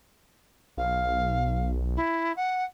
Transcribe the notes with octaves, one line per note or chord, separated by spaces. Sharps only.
B1 F5
E4
F#5